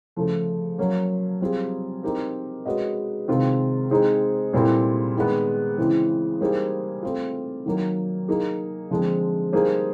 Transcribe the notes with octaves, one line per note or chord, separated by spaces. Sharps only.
C#3 F3 A3
F#3 A#3 C#4
G3 C4 F4 G#4
C4 D#4 G4 A#4
G#3 C#4 F#4 B4 D#5
C3 D#3 G#3 C4 F4
G#3 C4 D#4 G#4 C5
A#2 G3 C4 E4 A4
D#3 G#3 B3
C#3 E3 G#3 C4
G3 A#3 D#4 G#4 C5
A3 C4 F4
D#3 F#3 A#3
A#3 D#4 G#4
D3 F3 G#3 C4
G3 A#3 D#4 G#4 C5